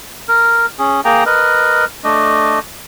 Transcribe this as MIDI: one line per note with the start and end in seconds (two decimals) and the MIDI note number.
0.29 0.66 70
0.79 1.01 61
0.79 1.01 68
1.05 1.24 58
1.05 1.24 68
1.05 1.24 79
1.05 1.24 82
1.26 1.85 70
1.26 1.85 71
1.26 1.85 75
2.04 2.59 57
2.04 2.59 62
2.04 2.59 75